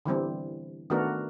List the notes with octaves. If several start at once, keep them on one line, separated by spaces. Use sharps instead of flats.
D3 E3 G3 C4
D#3 A3 B3 D4 F#4 A#4